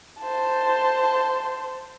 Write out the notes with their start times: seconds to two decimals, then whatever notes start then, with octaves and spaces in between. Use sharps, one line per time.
0.20 C5 A5